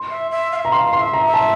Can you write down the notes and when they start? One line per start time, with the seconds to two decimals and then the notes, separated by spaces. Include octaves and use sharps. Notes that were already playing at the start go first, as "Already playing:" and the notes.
Already playing: C6
0.10 E5
0.31 E5
0.52 F5
0.56 E5
0.65 A#5
0.72 F5 C6
0.93 C6
0.99 E5
1.14 A#5
1.27 E5
1.34 A5